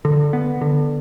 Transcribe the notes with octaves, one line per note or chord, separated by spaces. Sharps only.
D3
B3
D3